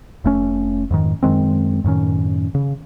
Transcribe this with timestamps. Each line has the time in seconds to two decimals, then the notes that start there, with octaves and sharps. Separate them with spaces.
0.24 F1 A3 C#4
0.91 F2 G#2 D#3
1.23 F#2 D#3 G#3 C4
1.84 F#2 A2 D#3 C#4
2.55 C#3